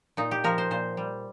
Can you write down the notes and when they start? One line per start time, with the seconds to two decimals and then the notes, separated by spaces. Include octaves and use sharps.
0.17 A#2 D#4
0.31 G4
0.44 F3 A#4
0.58 C5
0.71 A#2 C5
0.97 G3